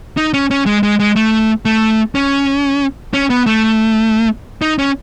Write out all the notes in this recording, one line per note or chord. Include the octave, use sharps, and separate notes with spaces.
D#4
C#4
C#4
G#3
G#3
G#3
A3
A3
C#4
C#4
B3
A3
D#4
C#4